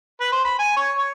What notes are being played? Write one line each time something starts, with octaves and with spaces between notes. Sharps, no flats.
B4
C5
B5
G#5
C#5
C#5